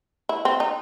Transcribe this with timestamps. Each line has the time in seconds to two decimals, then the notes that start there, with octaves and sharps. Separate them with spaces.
0.29 E4
0.45 C4
0.60 D#4